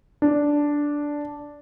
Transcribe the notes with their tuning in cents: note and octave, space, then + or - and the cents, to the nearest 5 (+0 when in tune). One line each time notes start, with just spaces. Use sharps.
D4 -5